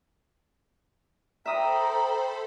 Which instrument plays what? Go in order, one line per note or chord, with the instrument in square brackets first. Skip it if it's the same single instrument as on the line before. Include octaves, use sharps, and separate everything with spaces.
[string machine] A4 C5 B5 [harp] E5 D#6 [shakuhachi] G5 [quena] A#5